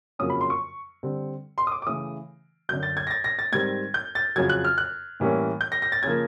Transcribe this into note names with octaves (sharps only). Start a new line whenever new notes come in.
F2 C#3 F#3 A#3 C#4 D#6
B5
C6
C#6
D3 G3 C4
C6
D#6
D6
D6
C#3 E3 A3 D#6
F#2 D3 F#3 G6
A6
G#6
A#6
A6
A#6
A6
G#2 D#3 G3 C4 G#6
G6
A6
F2 C#3 F#3 G#6
F#6
F6
F#6
A2 E3 G3 A#3 C#4
G6
A#6
A#6
A6
C#3 F3 A#3 G#6